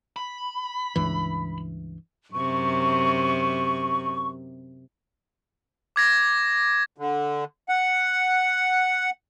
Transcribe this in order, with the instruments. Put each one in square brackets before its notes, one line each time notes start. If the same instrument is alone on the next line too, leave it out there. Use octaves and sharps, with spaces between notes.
[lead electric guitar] B5
[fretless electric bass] C#2 G2 E3
[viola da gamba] F#2 C3 [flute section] C#6
[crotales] D6 G#6 A#6
[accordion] D3
F#5